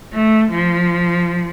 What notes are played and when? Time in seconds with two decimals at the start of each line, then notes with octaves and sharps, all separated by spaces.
0.13 A3
0.52 F3